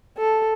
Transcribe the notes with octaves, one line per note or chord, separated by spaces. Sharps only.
A4